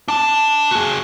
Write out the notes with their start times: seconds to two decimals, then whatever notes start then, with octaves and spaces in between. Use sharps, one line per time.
0.08 D4 A5
0.71 F#4 G#4